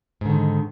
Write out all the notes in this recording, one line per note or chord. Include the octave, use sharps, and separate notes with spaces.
G#2 D3 D#3